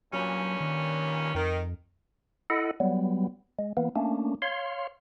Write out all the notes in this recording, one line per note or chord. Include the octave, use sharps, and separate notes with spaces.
G2 A#2 F#3 C#4
D#3
F2 D#3
E4 A4 D#5 F#5
F#3 G3 B3
G#3
E3 A#3 B3
A3 A#3 C#4 D4
C#5 F5 C6